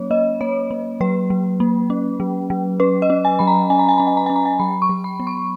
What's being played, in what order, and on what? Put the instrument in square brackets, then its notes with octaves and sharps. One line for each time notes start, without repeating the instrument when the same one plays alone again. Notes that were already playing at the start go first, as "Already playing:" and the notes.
Already playing: [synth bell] F#3 A#3 C#4 C#5
A#3 D#5
A#3 C#5
A#3
F#3 B4
F#3
A#3
C#4
F#3
F#3
C#4 B4
D#5
C#4
G#5
F#3 B5
A#5
C#4 G#5
A#5
G#5
C#4 A#5
G#5
A#5
C#4 G#5
A#5
G#5
F#3 B5
C#6
F#3
B5
B3
C#6